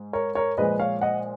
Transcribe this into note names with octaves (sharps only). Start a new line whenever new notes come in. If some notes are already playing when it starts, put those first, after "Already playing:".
Already playing: G#2
A#4 C#5
A#4 C#5
A#2 F3 G#3 B4 D#5
C#5 F5
D#5 F#5